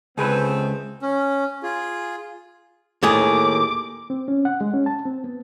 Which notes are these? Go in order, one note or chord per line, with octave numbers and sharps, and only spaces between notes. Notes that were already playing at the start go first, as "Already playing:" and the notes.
C#2 A3 B3 C4 G#4 B4
C#4
F4 G#4
D#2 A2 G#4 D6
C4
C#4
F#5
G#3
C#4
A5
C4
B3